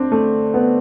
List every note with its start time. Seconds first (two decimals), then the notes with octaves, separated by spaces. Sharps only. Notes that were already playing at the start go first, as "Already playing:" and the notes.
Already playing: D2 C4 D4
0.12 A3
0.54 B3